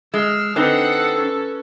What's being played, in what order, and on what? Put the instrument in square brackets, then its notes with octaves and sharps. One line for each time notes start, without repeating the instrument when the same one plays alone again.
[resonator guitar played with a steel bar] G#3 [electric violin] E6 F6
[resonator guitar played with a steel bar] D3 C4 D#4 [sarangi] A4 [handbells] B4 [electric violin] F#5 D#6
[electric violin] C#4